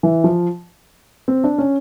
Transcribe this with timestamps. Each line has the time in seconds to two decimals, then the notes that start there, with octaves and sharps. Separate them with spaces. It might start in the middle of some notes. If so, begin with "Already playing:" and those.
0.03 E3
0.24 F3
1.28 C4
1.44 D4
1.58 C#4